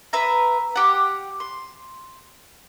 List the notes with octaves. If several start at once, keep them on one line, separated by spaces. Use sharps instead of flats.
B4 E5 A#5
G4 F#5
C6